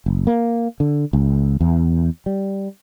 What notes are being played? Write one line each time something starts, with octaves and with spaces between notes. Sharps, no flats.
F#1
A#3
D3
C#2
E2
G3